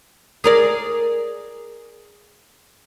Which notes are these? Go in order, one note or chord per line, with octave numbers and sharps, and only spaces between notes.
G#4 A#4 D5